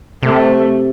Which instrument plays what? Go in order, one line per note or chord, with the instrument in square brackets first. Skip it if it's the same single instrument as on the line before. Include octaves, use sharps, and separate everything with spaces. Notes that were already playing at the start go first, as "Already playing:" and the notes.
[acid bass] C3 [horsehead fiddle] A3